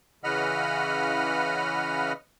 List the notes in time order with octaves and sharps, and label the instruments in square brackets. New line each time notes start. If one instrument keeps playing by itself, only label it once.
[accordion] C#3 E3 D#5 F#5 B5 F6